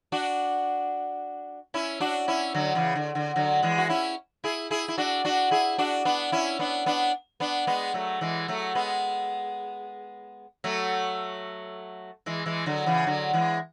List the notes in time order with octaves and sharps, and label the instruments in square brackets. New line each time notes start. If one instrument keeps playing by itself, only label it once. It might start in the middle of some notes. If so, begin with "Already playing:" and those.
[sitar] D4 F#4
C#4 E4
D4 F#4
C#4 E4
D3 F#3
C#3 E3
D3
D3
D3 F#3
E3 G#3
F#4
C#4 E4
E4 G#4
E4 G#4
E4
D4 F#4
D4 F#4
E4 G#4
D4 F#4
B3 D4
C#4 E4
B3 D4
B3 D4
B3 D4
G#3 B3
F#3 A3
E3 G#3
F#3 A3
G#3 B3
F#3 A3
E3 G#3
E3 G#3
D3 F#3
C#3 E3
D3 F#3
E3 G#3